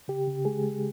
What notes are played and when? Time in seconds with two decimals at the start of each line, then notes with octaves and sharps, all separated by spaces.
0.08 C#3 G4
0.27 C#3
0.45 G#3 G#4
0.64 G#3